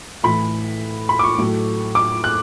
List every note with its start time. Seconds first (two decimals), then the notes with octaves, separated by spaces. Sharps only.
0.23 A2 E3 A3 B5
1.09 B5
1.19 D6
1.24 C#6
1.38 A2 F#3 A3
1.95 D6
2.24 F#6